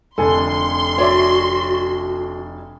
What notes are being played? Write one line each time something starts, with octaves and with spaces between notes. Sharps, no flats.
F1 F2 D3 A4 G#5 C6
F#4 C#5 D5 E5